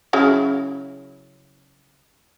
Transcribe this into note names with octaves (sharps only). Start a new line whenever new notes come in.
C#3 F#3 E4